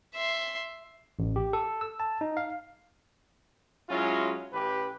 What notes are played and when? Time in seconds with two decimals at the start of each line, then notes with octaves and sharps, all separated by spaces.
0.15 E5 C6
1.19 A1
1.36 G4
1.53 A4
1.81 E6
2.00 A5
2.21 D#4
2.37 F5
3.89 F#3 G#3 C#4 E4 F4
4.52 A1 G4 B4